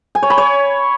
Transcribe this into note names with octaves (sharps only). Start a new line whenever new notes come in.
G#5
C#5
B5
C#5